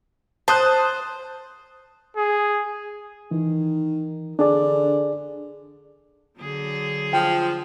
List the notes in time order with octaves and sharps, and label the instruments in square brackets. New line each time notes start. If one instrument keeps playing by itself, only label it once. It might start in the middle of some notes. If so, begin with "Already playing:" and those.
[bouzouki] C5 [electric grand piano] A5 D#6 F#6
[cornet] G#4
[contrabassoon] D#3 [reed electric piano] E3
[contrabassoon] D3 [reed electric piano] D4 G#4 D5
[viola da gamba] D3 F#3 G#4
[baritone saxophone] F3 [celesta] G5